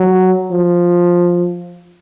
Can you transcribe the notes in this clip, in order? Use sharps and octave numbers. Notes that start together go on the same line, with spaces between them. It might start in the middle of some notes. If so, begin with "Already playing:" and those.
Already playing: F#3
F3